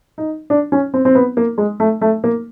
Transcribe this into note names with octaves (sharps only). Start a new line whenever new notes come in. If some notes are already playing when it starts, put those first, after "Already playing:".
D#4
D4
C#4
C4
C4
B3
A#3
G#3
A3
A3
A#3